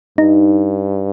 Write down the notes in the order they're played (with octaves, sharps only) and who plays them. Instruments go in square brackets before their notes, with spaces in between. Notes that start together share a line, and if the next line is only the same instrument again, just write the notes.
[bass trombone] G2 [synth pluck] D#4